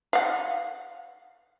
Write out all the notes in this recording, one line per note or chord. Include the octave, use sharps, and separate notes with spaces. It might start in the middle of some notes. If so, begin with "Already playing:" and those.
F5 F#5